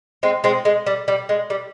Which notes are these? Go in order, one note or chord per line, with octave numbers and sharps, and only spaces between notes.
G#3 C4
G#3 C4
G#3
G3
G3
G#3
G3